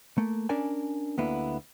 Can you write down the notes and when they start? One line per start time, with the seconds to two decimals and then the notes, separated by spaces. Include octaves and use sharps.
0.18 A3 A#3
0.49 C#4 D4 A#4 D5 G#5
1.18 D2 D3 A#3 B3 E4